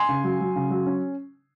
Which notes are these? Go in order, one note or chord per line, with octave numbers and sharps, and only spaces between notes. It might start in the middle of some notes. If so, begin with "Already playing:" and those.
Already playing: G#5 C6
C#3
F#3
F#3
C#3
F#3
C#4